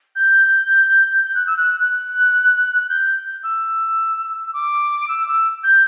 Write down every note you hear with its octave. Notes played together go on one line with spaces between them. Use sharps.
G6
G6
F#6
E6
F#6
F#6
G6
E6
D6
E6
E6
G6